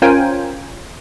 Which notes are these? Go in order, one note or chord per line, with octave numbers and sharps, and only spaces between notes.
C#4 F4 A#4 C5 G5 G#5